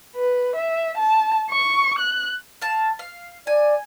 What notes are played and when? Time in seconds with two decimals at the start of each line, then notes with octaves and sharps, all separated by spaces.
0.16 B4
0.56 E5
0.98 A5
1.51 C#6
1.99 F#6
2.62 F5 A5
2.99 F5
3.47 D5 G#5